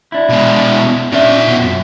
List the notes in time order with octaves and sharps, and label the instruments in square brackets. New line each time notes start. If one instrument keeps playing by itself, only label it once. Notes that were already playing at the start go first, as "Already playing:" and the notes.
[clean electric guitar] D4 E4
[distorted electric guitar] B2 G#3
[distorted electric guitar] A#2 E5 [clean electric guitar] C#4 D4
[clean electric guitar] B2
F#2